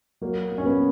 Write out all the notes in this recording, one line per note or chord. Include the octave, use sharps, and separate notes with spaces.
F#3 A#3
A#2
C#4
B3